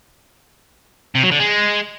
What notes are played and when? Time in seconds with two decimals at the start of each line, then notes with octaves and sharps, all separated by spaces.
1.15 C3
1.23 F#3
1.31 D3
1.40 G#3